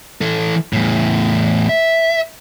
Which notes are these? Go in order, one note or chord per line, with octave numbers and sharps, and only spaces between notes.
E3 A4
E2 A2
E5